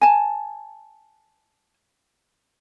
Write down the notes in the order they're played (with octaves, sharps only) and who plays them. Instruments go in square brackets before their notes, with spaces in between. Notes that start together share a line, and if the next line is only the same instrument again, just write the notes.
[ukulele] G#5 A5